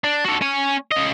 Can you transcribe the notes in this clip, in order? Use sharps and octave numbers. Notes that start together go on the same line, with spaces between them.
D4
F#4 A4
C#4 G#5
C#3 D#5